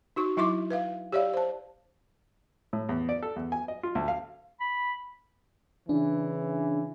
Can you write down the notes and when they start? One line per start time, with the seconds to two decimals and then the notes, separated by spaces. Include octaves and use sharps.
0.16 D#4 F#4 C#6
0.37 F#3 E4 E5 C6 D6
0.70 B4 E5 F5
1.12 G4 C#5 D5 E5 F5
1.34 C5 A5
2.73 A2
2.89 E2
3.09 D5
3.23 A4
3.36 E2
3.52 G#5
3.68 D#5
3.83 F4
3.95 D2
4.08 F5
4.60 B5
5.89 C#3 E3 D4